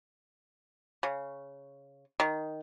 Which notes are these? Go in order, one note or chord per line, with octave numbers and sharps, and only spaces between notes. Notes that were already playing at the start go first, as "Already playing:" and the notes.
C#3
D#3